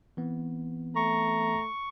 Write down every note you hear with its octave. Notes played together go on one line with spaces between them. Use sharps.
E3 B3 C4
A3 A#5 C#6